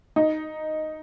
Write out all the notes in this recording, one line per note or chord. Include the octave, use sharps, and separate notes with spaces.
D#4